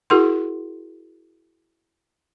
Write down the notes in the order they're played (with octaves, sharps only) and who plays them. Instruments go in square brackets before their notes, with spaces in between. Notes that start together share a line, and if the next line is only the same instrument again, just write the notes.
[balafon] E4 F#4 G#4 A#4 F#5 C6